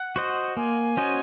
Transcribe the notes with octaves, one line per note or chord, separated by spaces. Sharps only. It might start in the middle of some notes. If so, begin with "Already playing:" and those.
Already playing: F#5
F#4 C5 D#5
A#3 G#5
C#4 F#4 C5 D#5